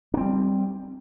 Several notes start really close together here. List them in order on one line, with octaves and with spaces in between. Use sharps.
D4 C4 G3